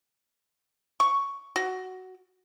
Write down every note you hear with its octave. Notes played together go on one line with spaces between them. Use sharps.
C#6
F#4